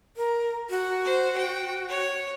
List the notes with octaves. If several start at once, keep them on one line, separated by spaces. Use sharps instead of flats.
A#4
F#4
C5
G5
C#5